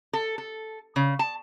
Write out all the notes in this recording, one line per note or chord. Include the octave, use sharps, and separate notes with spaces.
A4
A4
C#3
A5